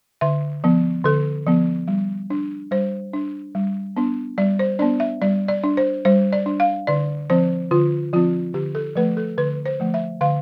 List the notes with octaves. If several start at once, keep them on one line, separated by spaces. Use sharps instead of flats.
D3 E5
F3 B3
D3 A4
F3 B3
G3
D4
G3 C5
D4
G3
B3 D4
G3 D5
C5
B3 D4 D5
E5
G3 D5
D5
D4
C5
G3 C5
D5
D4
F5
D3 D5
F3 C4 C5
D3 F4
F3 C4 F4
D3 G4
A4
F3 A3 B4
A4
D3 B4
C5
F3 A3
E5
D3 F5